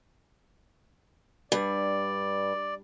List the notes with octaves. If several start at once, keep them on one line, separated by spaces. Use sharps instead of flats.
G2 D5